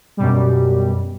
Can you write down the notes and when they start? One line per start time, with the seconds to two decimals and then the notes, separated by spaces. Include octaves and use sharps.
0.17 F#2 B2 G3